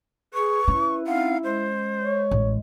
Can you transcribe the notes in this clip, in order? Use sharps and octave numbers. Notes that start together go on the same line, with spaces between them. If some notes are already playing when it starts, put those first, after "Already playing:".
G#4 B4 C#6
C#4 E4
C4 D#4 F5 F#5
G#3 C5
C#5
A1